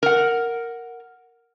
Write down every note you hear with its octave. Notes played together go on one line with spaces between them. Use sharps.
A#4 F#5